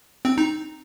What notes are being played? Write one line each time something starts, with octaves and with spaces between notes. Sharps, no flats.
C4
D#4